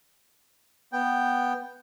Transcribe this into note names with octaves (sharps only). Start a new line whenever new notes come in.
B3 G5